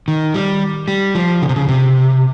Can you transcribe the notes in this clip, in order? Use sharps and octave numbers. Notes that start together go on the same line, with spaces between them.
D#3
G3
G3
F3
C#3
C3
C#3
C3